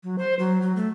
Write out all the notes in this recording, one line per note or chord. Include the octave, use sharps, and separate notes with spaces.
F#3
C5
F#3
F#3
A3